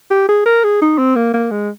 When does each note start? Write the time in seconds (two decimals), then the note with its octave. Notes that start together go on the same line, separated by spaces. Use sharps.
0.11 G4
0.29 G#4
0.46 A#4
0.64 G#4
0.82 D#4
0.98 C4
1.16 A#3
1.34 A#3
1.51 G#3